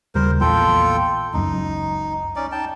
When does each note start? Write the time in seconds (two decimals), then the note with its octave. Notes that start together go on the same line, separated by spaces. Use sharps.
0.15 D#2 C#3 G3 A#4 C5
0.41 A#1 E2 A#2 F4 A4 G5
1.34 F#1 C#2 F#2 D#4
2.36 C#4 D#4 D5
2.52 D#4 G5 A5